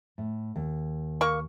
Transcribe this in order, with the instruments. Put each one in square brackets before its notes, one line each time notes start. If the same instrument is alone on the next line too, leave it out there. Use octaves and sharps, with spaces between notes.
[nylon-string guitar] A2
D#2
[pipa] A#3 C#6